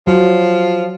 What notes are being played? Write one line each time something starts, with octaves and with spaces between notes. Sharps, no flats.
F3 F#3